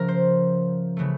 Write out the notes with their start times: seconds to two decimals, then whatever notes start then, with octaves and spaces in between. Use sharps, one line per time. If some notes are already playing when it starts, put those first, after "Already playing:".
Already playing: C#3 F3 A3 A#4
0.08 C5
0.97 C#3 E3 A3